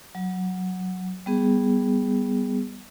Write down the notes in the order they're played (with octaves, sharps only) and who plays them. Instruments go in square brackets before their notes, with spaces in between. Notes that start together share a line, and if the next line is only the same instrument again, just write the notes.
[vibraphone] F#3
G3 B3 G#4